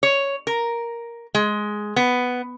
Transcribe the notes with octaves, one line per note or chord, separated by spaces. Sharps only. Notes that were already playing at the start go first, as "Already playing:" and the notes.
C#5
A#4
G#3
B3